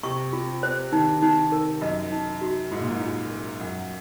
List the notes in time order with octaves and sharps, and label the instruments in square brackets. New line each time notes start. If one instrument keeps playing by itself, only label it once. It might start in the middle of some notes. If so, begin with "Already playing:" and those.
[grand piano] C3 [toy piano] C#6
[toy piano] F4
C5
[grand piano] D#3 [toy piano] D#4
[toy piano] D#4
A#4
[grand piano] F#2 [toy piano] D#5
[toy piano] D#4
F#4
[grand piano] G#2 [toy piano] F4
[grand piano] A#2
G#2
[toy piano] F4
A#4
[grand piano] F#2 [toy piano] F#5